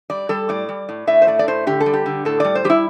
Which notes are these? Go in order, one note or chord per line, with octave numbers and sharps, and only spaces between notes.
G3 D5
G3 A4
A2 D5
G3
A2
A2 E5
C5
A3 D5
D5
A2 C5
D3 G4
A4
G3
G4
D3
A2 A4
G3 D5
C5
G3 G4
E4